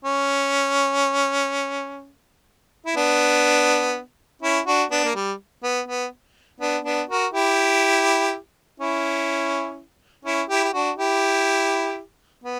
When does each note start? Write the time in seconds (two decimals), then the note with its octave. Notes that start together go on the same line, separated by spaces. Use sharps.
0.05 C#4
2.86 E4
2.96 B3 D4
4.42 C#4 E4
4.66 D4 F#4
4.91 B3 D4
5.04 A#3
5.15 G3
5.63 B3
5.88 B3
6.60 B3 D4
6.85 B3 D4
7.09 F#4 A#4
7.33 E4 G4
8.80 C#4 E4
10.25 C#4 E4
10.49 E4 G4
10.64 G4
10.73 D4 F#4
10.97 E4 G4
12.44 B3